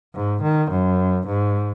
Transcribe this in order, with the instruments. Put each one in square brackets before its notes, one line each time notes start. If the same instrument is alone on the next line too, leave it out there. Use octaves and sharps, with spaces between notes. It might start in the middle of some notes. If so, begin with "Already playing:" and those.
[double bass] G#2
D#3
F#2
G#2